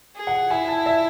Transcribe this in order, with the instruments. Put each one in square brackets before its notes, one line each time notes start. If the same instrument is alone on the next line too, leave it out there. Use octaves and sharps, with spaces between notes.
[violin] G#4
[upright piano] F#5
[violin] E4 [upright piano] G#5
[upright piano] A5
E5